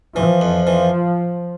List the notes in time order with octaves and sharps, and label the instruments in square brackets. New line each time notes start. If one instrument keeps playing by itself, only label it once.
[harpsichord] E3 [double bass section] F3
[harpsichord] F2
E3